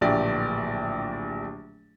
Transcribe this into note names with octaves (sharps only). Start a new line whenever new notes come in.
D1 A#1 G4 D5 E5